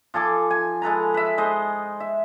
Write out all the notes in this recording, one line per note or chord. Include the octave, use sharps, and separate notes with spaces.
F3 A4 G#5 D6
G#5
G#3 A4 B4 A#5
B4 E5
G#3 C5 D#5
E5